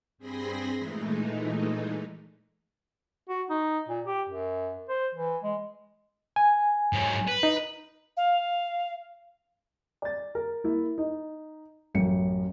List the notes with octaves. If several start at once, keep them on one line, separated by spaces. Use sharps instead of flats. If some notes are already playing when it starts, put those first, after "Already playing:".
G2 C4 G#4 B5 C6 A#6
A#2 E3 G#3 A3 D#4
F#4
D#4
A#2
G4
F#2
C5
E3
G#3
G#5
G#2 F#3
B4
D#4
F5
D5 A6
A#4
A#3 E4
D#4
A1 F#2 C#7